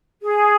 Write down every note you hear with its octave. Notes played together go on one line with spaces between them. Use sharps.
G#4